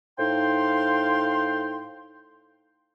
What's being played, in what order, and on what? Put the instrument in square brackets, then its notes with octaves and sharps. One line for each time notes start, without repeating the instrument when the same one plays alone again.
[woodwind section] A2 D#4 C5 F5 G5 C6